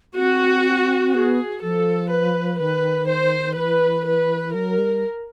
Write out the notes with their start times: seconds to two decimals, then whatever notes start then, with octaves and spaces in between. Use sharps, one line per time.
0.16 C4 F#4
1.13 B3 G#4
1.62 F3 A4
2.11 B4
2.59 D#3 B4
3.08 C5
3.56 E3 B4
4.05 B4
4.54 F#3 A#4
4.78 G3